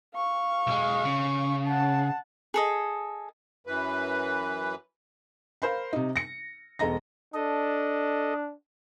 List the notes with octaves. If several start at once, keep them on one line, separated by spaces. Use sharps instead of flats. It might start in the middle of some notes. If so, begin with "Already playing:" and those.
F5 C#6
B1 G#3
C#3
F#5 A5
G#4 A4 D#5
F#2 E3 B4
A#4 C5 F5 B5
C3 D#4
A#6 C#7
E1 G#3 A4 D#5 A#5 A#6
D4 A4 D#5